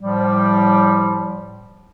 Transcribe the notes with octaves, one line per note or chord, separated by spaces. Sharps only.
A2 F3 G3